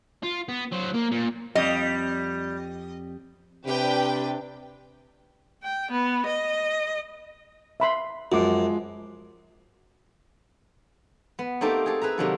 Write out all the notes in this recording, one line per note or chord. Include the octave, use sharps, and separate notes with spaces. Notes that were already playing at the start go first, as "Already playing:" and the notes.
F4
B3
F#3 C5
A#3
A#2
F2 G3 D#5
C3 D4 G4 B4 G5
G5
B3
D#5
E5 B5 C6
F#2 F3 G#3 F#4 F#5 D6
B3
A3 A#3 C4 D#4 G4 A4
G#4 A4
G#4 B4 E5 A#5
C3 D#3 F#3 A#3 F#4 A4